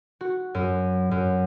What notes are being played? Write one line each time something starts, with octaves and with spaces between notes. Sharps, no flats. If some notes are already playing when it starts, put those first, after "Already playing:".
F#4
F#2
F#2